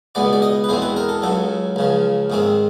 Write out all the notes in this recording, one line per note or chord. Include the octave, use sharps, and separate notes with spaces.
C#2 B2 G#3 B3 D5
D5
D#5
B4
E2 B2 G#3 C4 C5
B4
A#4
A4
C#2 C#3 F#3 A4
C#2 C#3 F3
G#2 D#3 G#3 C4